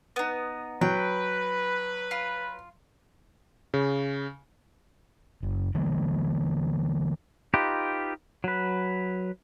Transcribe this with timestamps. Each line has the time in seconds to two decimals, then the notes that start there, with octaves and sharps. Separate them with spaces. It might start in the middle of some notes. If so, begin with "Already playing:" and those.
0.16 B3 D#4
0.81 F#3 B4 G5
2.11 F4
3.74 C#3
5.43 F#1
5.75 D3 E3 G3 A#3
7.54 D#4 F4 G4 B4
8.44 F#3 B4